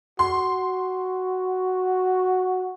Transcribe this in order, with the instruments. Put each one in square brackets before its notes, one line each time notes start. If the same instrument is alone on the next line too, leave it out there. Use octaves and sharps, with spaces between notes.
[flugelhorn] F#4 [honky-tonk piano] C6